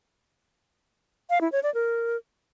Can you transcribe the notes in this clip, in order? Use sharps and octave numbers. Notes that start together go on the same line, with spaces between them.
F5
E4
C#5
D5
A#4